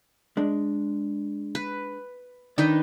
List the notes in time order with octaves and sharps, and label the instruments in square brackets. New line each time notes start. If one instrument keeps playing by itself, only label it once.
[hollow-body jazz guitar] G#3 D4
[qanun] B4
[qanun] D#3 D#4 B4 [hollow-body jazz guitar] D4 D5